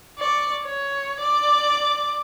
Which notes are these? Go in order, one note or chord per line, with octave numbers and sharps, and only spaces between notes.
D5 C#6
C#5
D5 D6